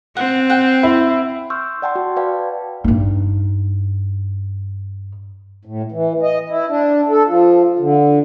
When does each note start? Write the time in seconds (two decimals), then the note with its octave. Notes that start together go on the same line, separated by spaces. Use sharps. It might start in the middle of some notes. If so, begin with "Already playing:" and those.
0.17 C4 F#5
0.50 F#5 G5
0.83 E4
1.50 C6 C#6 E6 F6 G6
1.82 D5 F#5 G5 A5 C6
1.95 F#4
2.16 B4 D5 F5 G5 A5
2.84 G2 D#4
5.65 A2
5.92 E3
6.23 D#5
6.49 E4
6.68 D4
7.09 A4
7.26 F3
7.79 D3